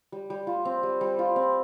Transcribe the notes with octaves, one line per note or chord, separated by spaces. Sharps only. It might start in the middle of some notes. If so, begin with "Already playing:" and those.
G3
G3
F4
C4
G3
G3
F4
C4